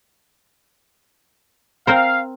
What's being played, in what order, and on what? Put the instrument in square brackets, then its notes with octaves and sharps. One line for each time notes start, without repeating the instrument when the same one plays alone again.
[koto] C4 A#4 C5 [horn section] F5